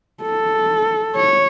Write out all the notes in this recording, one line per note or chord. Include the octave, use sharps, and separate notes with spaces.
A4
C#5